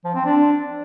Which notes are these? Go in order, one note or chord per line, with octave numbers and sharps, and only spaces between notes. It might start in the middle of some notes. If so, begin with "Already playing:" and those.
F3
C4
D4